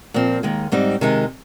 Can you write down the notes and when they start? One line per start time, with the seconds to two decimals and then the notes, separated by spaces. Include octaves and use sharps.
0.14 A#2 F3 C4
0.43 D#2 D#3 G#3
0.72 G#2 G3 C4 D#4
1.01 C3 D#3 G#3 D#4